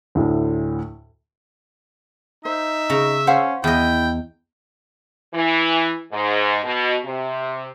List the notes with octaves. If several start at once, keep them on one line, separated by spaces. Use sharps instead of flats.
D2 A2
D#4 C5 E5
C#3 A#5
C#4 C5 F5 F#5
E2 E4 D#5 G5
E3
G#2
B2
C3